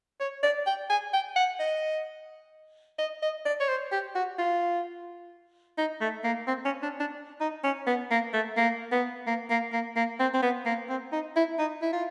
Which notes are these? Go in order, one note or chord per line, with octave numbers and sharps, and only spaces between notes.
C#5
D5
G5
G#5
G5
F#5
D#5
D#5
D#5
D5
C#5
C5
G4
F#4
F4
D#4
A3
A#3
C4
C#4
D4
D4
D#4
C#4
B3
A#3
A3
A#3
B3
A#3
A#3
A#3
A#3
C4
C4
B3
A#3
C4
D#4
E4
D#4
E4
F4